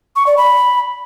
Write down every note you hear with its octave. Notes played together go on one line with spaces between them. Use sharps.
C#6
D5
B5